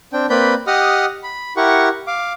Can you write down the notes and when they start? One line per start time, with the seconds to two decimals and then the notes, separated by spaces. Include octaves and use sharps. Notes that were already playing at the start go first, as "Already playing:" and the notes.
0.13 C4 D4 G5
0.30 A#3 C4 B4 D5 B5 G6
0.67 G4 D#5 F#5 D#6 F6
1.23 B5
1.57 E4 G4 A#4 F#5 C#6
2.07 F5 D6